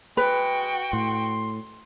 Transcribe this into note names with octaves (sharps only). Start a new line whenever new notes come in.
G#3 F#4 B4 G5
A2 C6